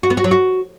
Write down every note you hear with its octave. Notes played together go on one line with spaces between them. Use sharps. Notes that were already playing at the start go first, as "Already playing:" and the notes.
F#4
B3
F#4
F#3
F#4